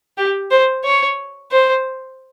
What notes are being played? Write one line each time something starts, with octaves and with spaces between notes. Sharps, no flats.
G4
C5
C#5
C5